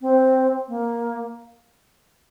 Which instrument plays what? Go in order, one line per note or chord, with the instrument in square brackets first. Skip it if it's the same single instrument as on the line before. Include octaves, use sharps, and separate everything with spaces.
[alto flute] C4
A#3